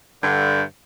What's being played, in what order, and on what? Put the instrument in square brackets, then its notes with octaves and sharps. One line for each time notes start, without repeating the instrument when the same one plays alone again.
[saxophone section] G2 D3